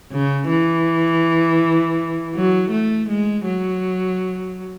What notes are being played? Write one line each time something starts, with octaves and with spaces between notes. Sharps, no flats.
C#3
E3
F#3
A3
G#3
F#3